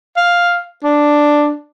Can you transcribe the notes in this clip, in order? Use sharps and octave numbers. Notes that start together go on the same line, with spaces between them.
F5
D4